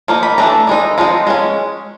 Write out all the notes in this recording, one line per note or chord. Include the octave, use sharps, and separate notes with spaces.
F3 A#3 D#4
B5
E3 A3 D4 A#5
E3 G#3 D#4
F3 G#3 C4 D#4
G#3 C#4